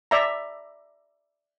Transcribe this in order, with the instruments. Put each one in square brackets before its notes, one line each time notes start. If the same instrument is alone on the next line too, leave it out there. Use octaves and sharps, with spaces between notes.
[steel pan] D5 E5 A#5